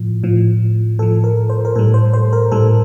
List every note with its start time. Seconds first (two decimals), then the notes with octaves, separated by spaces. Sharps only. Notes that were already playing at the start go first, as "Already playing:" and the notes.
Already playing: A2 F3
0.23 A2 F3
0.99 A2 F3 A4
1.24 A#4
1.49 C5
1.65 A#4
1.75 A2 G3 A4
1.94 C5
2.13 C5
2.33 A#4
2.51 A2 G3 A4